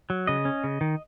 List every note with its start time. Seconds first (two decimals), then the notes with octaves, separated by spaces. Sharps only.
0.10 F#3
0.27 C#3 D#5
0.45 C#4
0.64 C#3
0.81 D#3